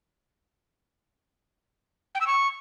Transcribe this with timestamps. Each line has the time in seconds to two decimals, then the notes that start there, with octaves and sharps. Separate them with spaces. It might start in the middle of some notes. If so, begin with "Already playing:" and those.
2.15 G5
2.21 E6
2.27 C#6